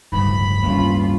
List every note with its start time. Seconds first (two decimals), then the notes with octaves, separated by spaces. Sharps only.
0.12 D1 C#2 G2 D#3 F3 B5
0.63 D1 G2 E3 A#3 C#4 F4